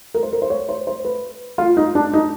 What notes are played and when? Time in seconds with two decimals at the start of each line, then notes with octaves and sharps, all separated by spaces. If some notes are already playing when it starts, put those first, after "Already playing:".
0.15 A#4
0.23 C5
0.33 A#4
0.42 C5
0.50 C#5
0.69 C5
0.87 C5
1.05 B4
1.58 F4
1.77 D#4
1.95 D4
2.13 D#4